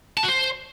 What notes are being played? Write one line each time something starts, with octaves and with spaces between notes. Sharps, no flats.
A5
F#4
C5